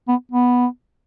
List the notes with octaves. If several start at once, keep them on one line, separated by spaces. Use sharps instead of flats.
B3
B3